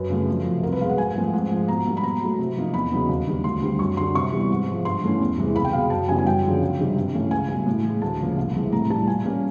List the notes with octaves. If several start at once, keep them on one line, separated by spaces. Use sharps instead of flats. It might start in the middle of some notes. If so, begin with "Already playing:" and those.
Already playing: F#2 B4
C#3 F#3 A3
F2
C3 F3
C2 A#4
B4
B2 G#3 F5
F#5
G#2 G#5
F3 A3 C4
G#2
F3 G#3
B2 A#5
G3 A#3
B5
B2 A#5
F#3 A3
C3
F3 A#3 D#4
E2 B5
C#3 F#3 B3 D#4
D#2
D#3 G3
D2 C6
D3 G3 C4
F#2 C#6
D3 G3 C6
C3 C#6
E3 G3 B3
G#2
F3 G#3
G2 C6
E3 A3 C#4
E2
C3 E3 G#3
C#2 B5
G5
B2 G#3 F5
F#2 A5
C#3 E3 G3 B3 G#5
G#5
F#2 G5
D3 F3 G#3 C#4
C#2
C3 D#3 G3
G2
E3 A3 C#4
C#2 G#5
B2 G3
A2
E3 G#3
D2 A5
C#3 F3 A#3
C2
C3 E3 G#3
A2 A#5
E3 G3 A5
A#2 G#5
G3 A#3 C#4